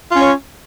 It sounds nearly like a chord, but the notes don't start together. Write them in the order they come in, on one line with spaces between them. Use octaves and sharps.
F4 C#4 C#5